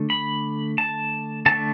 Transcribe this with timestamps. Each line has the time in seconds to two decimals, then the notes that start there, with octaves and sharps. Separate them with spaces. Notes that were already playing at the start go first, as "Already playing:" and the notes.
Already playing: D3 A3
0.10 B5
0.78 A5
1.46 D3 A3 A5